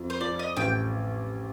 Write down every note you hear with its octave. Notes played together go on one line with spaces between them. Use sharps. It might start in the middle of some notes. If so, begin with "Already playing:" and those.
Already playing: F2
C5
F3 D5
D#5
A1 G5